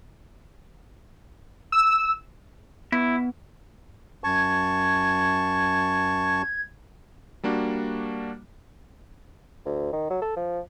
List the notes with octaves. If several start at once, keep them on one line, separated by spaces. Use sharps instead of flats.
E6
B3 E4
F#2 A5 C#6 G#6
G3 A#3 D4 F#4
D2
D#3
F#3
A4
F3